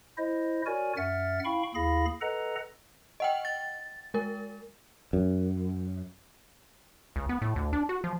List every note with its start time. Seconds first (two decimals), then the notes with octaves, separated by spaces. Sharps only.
0.18 E4 C5 D#5
0.66 F#4 A#4 C#5 D5 G#5
0.97 F#2 E5 F#5 F6 A6
1.45 E4 F5 G5 B5 C#6
1.75 D#2 E4 G#4 F5 B5 A#6
2.21 A4 B4 D#5 F#5 A#5
3.20 D#5 F#5 G5
3.45 A6
4.14 G#3 A#4
5.13 F#2
7.16 C#2
7.29 B3
7.42 A2
7.56 D2
7.73 D4
7.89 F#4
8.04 F3